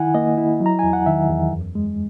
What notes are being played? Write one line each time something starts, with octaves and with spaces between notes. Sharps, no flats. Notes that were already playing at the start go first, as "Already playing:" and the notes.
Already playing: D#3 E4 F#5 G#5
A#3 D#5
E4
F#3
A#5
E2 G#5
F#5
D#3 E5
E2
F#2
G#3